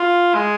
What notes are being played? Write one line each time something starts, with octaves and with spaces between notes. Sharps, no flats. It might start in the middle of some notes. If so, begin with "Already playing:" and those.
Already playing: F4
G#3